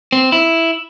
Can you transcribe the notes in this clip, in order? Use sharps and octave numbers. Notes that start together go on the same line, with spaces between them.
C4
E4